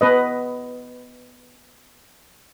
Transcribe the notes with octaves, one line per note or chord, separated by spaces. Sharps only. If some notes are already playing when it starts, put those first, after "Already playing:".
B3 B4 D#5